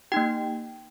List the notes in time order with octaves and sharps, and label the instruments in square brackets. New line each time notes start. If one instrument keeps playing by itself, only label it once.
[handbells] A#3 D#4 G4 G5